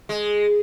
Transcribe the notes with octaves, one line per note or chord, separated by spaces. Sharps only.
G#3